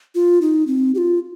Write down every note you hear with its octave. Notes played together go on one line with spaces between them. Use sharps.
F4
D#4
C4
G4
F4